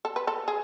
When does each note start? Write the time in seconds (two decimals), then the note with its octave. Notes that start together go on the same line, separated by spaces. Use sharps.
0.05 A4
0.16 B4
0.27 A4
0.48 G#4